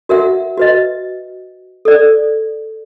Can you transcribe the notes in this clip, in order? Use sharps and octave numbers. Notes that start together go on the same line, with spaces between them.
F#4 A#4 E5 F#5
F#4 B4 D#5
A4 D5